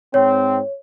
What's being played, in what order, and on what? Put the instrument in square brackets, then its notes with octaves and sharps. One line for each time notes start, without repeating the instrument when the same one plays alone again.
[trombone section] G#2 C4 [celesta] C#5